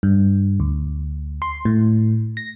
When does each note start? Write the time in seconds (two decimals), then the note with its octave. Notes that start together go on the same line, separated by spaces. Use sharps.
0.03 G2
0.60 D2
1.42 C6
1.65 A2
2.37 A#6